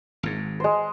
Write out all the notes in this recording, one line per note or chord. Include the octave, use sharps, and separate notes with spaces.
G#1 G#2
G#3 C5